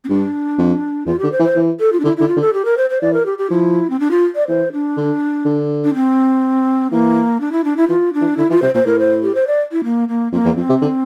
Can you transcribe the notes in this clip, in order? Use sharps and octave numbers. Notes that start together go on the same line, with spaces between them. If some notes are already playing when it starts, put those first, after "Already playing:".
C4
G2 D4
F2
E2 F4
D3 G4
C5
E3
C5
E3
A4
F4
D4
D3 E4
D3 E4
F4
D3
A4
G4
A#4
C5
C5
E3 D5
A#4
G4
G4
F3 E4
C4
D4
F4
D5
E3 C5
D4
D3
D3
D4
C4
E3 A#3
D4
E4
D4
E4
E3 F4
D4
E3
D3 E4
E3 F4
C3 C5
A#2 C5
A2 A#4
C5
G4
C5
D5
E4
A#3
A#3
F2 A#3
E2
F2 C4
C3
D3